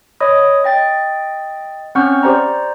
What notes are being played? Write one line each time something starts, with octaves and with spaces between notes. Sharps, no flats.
C#5 D#5 B5 D#6
D#5 G5 A6
C4 C#4 F#5 C#6 F6 G6
G4 C5 D5 A#5